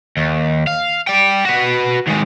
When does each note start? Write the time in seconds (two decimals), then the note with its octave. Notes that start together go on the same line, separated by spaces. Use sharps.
0.17 D#2
0.67 F5
1.07 D5 G5
1.45 F#4 B4
2.07 D#2 G#3